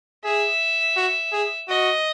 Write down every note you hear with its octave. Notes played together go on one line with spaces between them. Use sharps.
G#4 E5
F#4
G#4
F#4 D#5